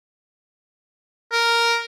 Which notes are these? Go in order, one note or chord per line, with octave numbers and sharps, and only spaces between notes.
A#4